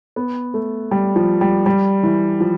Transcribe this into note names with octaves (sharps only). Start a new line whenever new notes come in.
B3
A3
G3
F3
G3
G3
E3
F3